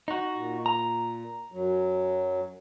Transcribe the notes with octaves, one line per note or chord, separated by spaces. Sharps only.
D#4 F#4
A#2
A#5
F#2 F#3